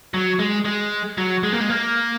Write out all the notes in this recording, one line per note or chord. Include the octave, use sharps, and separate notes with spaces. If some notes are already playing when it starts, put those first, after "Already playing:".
F#3
G#3
G#3
F#3
G#3
A#3
G#3
A#3